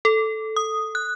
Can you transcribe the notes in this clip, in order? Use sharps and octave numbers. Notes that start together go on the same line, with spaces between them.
A4
D#6
F#6